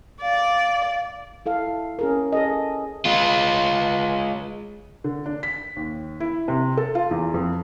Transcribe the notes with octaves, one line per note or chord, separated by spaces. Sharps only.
D5 F5
E4 A4 F5
C#4 G#4 A#4
G#4 A4 D#5
G#3 F4
D3
D4
B6
D#2
E4
C3
A4
F4
E2
F2